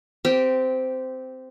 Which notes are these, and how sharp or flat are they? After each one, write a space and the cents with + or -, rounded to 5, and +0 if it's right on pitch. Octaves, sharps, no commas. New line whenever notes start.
C4 -15 G4 +0